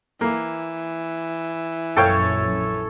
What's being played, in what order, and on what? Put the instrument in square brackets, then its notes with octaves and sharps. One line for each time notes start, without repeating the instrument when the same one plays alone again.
[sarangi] E3 [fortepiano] A#3
[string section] A#1 F#2 [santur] A4 C#5 [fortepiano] F5 G5